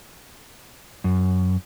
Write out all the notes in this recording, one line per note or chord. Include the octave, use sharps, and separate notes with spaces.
F#2